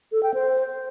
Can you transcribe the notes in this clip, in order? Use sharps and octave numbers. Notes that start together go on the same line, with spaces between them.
A4
G5
C5